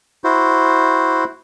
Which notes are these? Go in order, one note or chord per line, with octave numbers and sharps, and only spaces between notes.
E4 F#4 C5